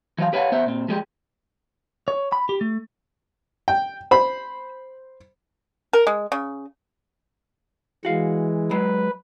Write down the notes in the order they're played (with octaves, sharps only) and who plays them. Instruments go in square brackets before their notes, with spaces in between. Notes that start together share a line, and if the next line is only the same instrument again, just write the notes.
[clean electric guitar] E3 F#3 F5
G4 B4 C#5 D#5 F5 F#5
B3 C5 E5 F#5
A#2 C4
F3 G#3 G4
C#5
B5
G4
A3
[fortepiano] G5
C5 B5
[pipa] A#4
G#3
C#3
[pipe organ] E3 G#3 [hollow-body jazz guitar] F#4 F5
[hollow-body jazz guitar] F#3 G#3 [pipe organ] B4